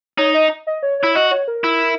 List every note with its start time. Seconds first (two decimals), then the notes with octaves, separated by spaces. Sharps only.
0.18 D#4 C#5
0.34 D#5
0.67 D#5
0.83 C#5
0.99 E4 C#5
1.15 F#4 D#5
1.31 C#5
1.48 A#4
1.64 E4